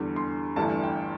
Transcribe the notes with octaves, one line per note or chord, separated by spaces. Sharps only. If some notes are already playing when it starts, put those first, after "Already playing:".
Already playing: E2 D3 G3
C6
G1 G2 E3 A3 A5
G5